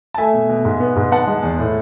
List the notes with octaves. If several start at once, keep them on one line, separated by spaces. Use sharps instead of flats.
A5
A3 E5 G#5
B2
B2
G#2
B3
G#2
B3 F#5 A5
G#3
E2
A2